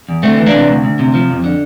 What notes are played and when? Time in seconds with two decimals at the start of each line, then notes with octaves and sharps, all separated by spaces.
0.09 E2
0.23 D2 A3 C4
0.38 E3
0.46 A#3 D4
0.54 C3
0.69 D2
0.84 D2
0.99 C3
1.14 F3
1.30 F2
1.44 D3